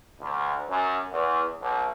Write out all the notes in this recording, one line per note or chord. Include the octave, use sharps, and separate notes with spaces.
D2
F#2
E2
B1